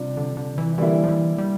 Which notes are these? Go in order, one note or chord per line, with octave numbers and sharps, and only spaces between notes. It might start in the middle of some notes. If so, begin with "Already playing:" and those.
Already playing: C3 G3 D4 F4
D3
D3
E3
D3 E3 G3 A#3 E4
F3
E3
G3